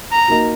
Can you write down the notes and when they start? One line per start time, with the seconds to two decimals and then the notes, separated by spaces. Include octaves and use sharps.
0.12 A#5
0.28 A#3 D#4 F#4